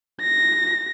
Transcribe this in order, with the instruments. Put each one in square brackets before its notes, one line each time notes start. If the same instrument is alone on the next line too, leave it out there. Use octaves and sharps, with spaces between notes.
[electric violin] A#6